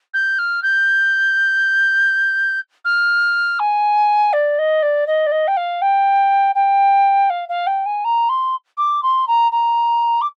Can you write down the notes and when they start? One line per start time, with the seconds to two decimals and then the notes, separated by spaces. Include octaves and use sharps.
0.13 G6
0.38 F6
0.62 G6
2.84 F6
3.59 G#5
4.33 D5
4.58 D#5
4.82 D5
5.06 D#5
5.26 D5
5.31 D#5
5.47 G5
5.56 F5
5.81 G5
6.55 G5
7.29 F5
7.48 F5
7.66 G5
7.85 G#5
8.04 A#5
8.29 C6
8.77 D6
9.02 C6
9.27 A#5
9.52 A#5
10.21 D6